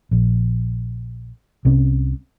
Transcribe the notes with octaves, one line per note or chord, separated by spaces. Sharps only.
A#1
C2 C3 C#4